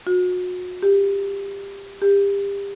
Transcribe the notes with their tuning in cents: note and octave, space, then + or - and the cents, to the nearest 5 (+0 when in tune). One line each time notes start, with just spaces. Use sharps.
F#4 -35
G4 +20
G4 +30